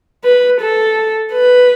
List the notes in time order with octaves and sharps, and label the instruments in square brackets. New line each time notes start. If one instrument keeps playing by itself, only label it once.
[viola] B4
A4
B4